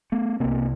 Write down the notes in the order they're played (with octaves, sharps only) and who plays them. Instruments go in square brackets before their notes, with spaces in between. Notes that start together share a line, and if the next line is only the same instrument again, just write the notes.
[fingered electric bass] A3 B3
C2 C3 A#3 C4